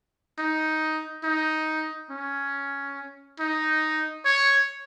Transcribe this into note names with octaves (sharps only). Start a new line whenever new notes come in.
D#4
D#4
C#4
D#4
C#5